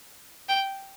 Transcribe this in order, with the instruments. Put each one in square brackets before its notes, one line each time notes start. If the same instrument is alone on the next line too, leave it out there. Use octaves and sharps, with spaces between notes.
[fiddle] G5